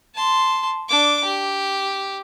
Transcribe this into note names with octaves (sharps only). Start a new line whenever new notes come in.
A5 C6
D4 D6
G4